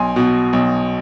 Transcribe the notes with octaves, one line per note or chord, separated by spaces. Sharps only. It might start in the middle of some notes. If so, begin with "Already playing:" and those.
Already playing: B1 G#5 C6
B2
B1